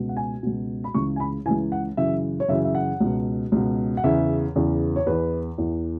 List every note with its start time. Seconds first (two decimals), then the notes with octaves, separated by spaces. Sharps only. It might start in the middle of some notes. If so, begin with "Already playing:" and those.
Already playing: C#2 B2
0.09 F#5
0.17 G#5
0.43 C#2 B2
0.84 B5
0.94 C#2 C#3 E3 C#6
1.16 G#5
1.20 B5
1.46 C#2 C#3 E3 G#5
1.72 F#5
1.97 F#2 C#3 E3 E5
2.40 C#5
2.48 F#2 C#3 E3 E5
2.65 E5
2.75 F#5
3.00 C#2 B2
3.52 C#2 B2
3.97 F#5
4.03 E2 C#3 E3 E5
4.56 E2 C#3 E3
4.96 C#5
5.06 E2 E3 B4
5.58 E2 E3